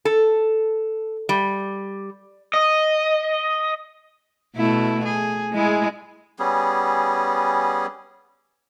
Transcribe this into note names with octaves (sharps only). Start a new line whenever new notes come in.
A4
G3
D#5
B2 A3 E4
G#4
G#3 E4 G#4
G3 B3 C#4 G#4